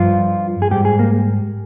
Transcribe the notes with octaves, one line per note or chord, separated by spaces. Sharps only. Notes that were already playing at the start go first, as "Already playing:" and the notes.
Already playing: G2 F3 F4
G#4
G#2 G3 G4
G#4
A#3